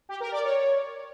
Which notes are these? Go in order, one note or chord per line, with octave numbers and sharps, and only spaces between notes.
G4
A#4
D5
C#5